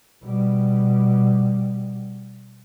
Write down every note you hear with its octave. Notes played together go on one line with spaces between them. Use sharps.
B2 G3